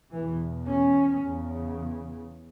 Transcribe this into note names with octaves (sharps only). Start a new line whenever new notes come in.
E2 B2 E3
C#4
E2 C#3